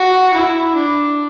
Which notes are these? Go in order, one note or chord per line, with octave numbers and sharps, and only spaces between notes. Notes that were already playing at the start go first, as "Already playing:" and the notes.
Already playing: F#4
E4
D4